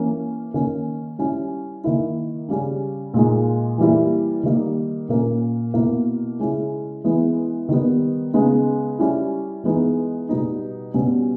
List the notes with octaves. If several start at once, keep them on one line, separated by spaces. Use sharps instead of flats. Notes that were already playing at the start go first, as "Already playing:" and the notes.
Already playing: E3 A#3 C#4
D#3 A#3 C#4
G3 C#4 E4
D#3 A#3 E4
C#3 G3 C#4
A#2 G#3 D#4
E3 G3 A#3 E4
D#3 G3 A#3 D#4
A#2 A#3 C#4
B2 A#3 E4
C#3 G#3 C#4 E4
E3 G#3 B3 E4
D#3 G3 B3
C#3 G#3 B3 D#4
G3 C#4 E4
E3 G#3 B3 D#4
B2 G3 B3 D#4
B2 G3 C#4